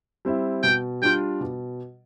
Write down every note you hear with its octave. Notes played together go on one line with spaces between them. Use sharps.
G3 C4 E4
B2 G5
G3 D4 F4 G5
B2